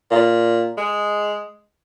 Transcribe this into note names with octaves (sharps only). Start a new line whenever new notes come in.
A#2
G#3